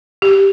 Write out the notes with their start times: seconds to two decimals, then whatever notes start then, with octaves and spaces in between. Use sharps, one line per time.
0.22 G4